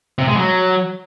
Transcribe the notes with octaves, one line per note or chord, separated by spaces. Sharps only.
C3
G#3
F#3